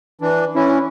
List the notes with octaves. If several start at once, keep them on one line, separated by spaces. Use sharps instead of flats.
E3 D4
E3 C#4 E4